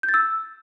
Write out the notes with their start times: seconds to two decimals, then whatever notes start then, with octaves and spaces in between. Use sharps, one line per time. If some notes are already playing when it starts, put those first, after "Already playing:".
0.03 G6
0.09 A6
0.14 E6